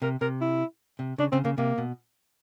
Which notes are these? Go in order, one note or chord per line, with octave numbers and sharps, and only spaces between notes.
C3 A#4
C3 A#4
E4
C3
C#3 D4
C#3 C4
C#3 A#3
C3 A#3
B2